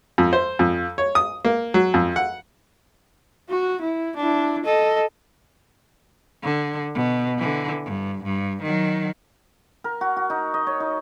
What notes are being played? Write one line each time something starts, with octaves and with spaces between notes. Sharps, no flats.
F2
C5
F2
C#5
D#6
A#3
F#3
F2
F#5
F#4
E4
D4 E4
A4 D#5
D3
B2
D3 E3
G2
G2
D#3 F#3
A#4
F#4
F#4
D#4
D#5
C#5
D#4